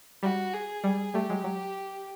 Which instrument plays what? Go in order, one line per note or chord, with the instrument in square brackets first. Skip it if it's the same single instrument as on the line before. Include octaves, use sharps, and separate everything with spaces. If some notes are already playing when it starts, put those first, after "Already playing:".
[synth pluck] G3 [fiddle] F#4
[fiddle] G#4
[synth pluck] G3
[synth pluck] G3 A3 [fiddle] G4
[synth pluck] F#3 G#3
F#3